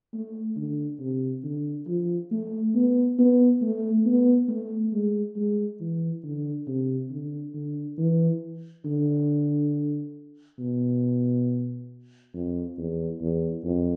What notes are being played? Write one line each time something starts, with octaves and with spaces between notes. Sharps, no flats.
A3
D3
C3
D3
F3
A3
B3
B3
A3
B3
A3
G#3
G#3
E3
D3
C3
D3
D3
E3
D3
B2
F2
E2
E2
F2